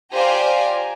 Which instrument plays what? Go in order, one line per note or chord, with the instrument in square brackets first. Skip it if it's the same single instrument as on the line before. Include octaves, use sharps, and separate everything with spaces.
[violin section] F4 G4 C5 D5 G#5 A#5